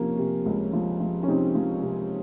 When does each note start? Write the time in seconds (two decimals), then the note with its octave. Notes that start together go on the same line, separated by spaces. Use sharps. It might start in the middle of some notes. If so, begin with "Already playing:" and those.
Already playing: C3 F3 A#3 C#4
0.18 C3
0.46 C#2
0.73 F3
1.00 F3
1.23 C#4
1.28 C3 C4 D#4
1.55 F3
1.82 C3